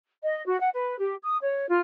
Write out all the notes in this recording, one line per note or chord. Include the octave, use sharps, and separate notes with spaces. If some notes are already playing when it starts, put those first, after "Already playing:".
D#5
F#4
F#5
B4
G4
D#6
C#5
F4